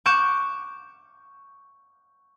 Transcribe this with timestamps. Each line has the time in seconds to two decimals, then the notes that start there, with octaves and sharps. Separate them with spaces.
0.06 C#6 D6 F#6 G6 E7